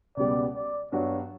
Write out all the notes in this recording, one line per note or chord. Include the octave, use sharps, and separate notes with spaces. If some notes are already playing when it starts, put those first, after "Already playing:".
C#2 B2 G3 B3 D5
D5
G2 F#3 B3 D4 F#4 C#5